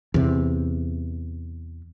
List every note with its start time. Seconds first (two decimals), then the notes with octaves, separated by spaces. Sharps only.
0.14 E2 C3